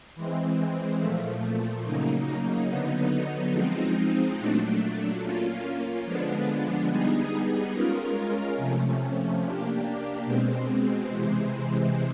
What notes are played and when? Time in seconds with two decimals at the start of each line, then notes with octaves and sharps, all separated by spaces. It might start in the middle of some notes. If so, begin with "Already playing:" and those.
0.15 E3 G#3 C4
0.99 A#2 F3 A3
1.84 C#3 F#3 A#3 D#4
2.68 D3 F#3 B3 D#4
3.52 F3 G#3 C4 D#4
4.36 A#2 F#3 A3 D4
5.21 A#3 C#4 F4
6.05 D3 F3 G#3 B3 D4
6.89 G3 B3 D#4 G#4
7.73 G#3 C#4 F4 A#4
8.57 C3 F3 A3 C#4
9.42 A#3 D4 G4
10.25 B2 G#3 C4
11.09 C3 E3 G#3 C4